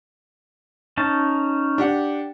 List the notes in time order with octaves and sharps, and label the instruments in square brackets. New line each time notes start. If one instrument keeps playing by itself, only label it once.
[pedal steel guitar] C#4 D#4 A5
[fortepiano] D4 G4 F#5